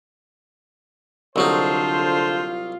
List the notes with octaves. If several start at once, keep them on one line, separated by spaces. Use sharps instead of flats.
C2 D3 F#3 D#4 F4 A4 C5